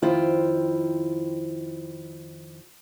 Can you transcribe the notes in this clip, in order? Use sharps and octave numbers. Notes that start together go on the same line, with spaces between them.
F2 D#3 E4 F4 C5 G5